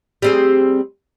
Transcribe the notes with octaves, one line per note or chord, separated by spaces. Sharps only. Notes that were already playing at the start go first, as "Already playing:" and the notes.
G3 C4 G#4